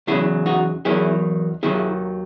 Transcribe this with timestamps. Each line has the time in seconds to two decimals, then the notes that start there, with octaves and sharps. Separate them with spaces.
0.07 E2 C#3 F#3 E4 G#4
0.46 D#4 F#4
0.85 E2 D#3 F#3 E4 G#4
1.63 D#2 D#3 F#3 E4 G#4